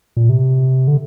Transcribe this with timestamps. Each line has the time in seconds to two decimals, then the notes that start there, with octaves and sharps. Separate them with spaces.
0.17 A#2
0.29 C3
0.88 D3